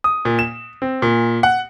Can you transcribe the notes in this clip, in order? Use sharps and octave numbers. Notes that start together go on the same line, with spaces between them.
D#6
A#2
E7
C4
A#2
F#5